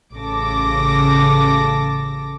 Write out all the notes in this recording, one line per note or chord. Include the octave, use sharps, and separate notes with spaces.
A1 C#3 A4 D6 A#6